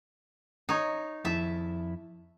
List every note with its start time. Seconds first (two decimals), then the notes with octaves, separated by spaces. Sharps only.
0.69 D#4 C#5
1.25 F2 E4 E5 A5